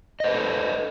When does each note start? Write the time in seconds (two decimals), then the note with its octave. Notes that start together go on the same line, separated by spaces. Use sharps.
0.20 D#5
0.24 C5
0.27 B4
0.31 G#4
0.34 A4